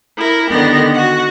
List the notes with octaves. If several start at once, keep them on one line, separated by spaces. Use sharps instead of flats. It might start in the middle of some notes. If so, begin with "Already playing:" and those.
E4 A#4
D3 D#3 B3 G4 A#6
F#4 F#5